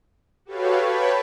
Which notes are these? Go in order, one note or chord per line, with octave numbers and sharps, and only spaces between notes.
F#4 G4 A4 B4 C#5 F5
B4 C#5 G5 A5 B5